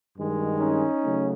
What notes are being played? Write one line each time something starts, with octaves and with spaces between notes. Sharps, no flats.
G2 D#3 G#3
C#4 D#4
C#3 F#3 A3